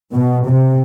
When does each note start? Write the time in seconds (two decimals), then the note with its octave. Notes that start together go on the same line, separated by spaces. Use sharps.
0.12 B2
0.47 C3